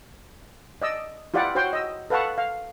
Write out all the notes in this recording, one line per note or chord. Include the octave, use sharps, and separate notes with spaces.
D5 D#5 E6
E4 F4 G4 D5 F#5
F#4 C5 C#5 F#5 G5 C6
D#5 E6
A4 B4 F5 F#5 A5 C#6
F5